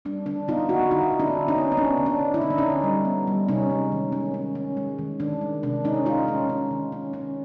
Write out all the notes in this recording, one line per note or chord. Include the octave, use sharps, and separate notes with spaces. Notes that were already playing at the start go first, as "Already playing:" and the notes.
G3 D4
D3 D4
B3 D#4 F4
D3 E4 F#4
D3 D#4 F4
D3
D4 E4
D3
C#4 D#4
B3
C#4
B3 D4
D3
D4
D3
E4
D3 D#4
D4
D3 C#4 D#4
G3
B3
G3
C3 C#4 D#4
G#3
D#3
C#4
C#4
C#4
G#3
D#3
D#3 D4
G#3
C3 D4
G#3 C#4 D#4
G#3 D#4 F4
C#4
C#4
D#3
C#4
C#4